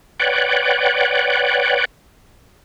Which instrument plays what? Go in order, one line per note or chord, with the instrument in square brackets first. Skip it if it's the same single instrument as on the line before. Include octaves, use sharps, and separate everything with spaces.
[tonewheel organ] B4 C#5 D5 F#5 G5